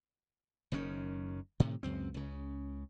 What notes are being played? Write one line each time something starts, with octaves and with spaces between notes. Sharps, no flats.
F#1 F#2 D#3 C#4
A2 C3 D#3
C#2 F#2 C4
C#2 C#3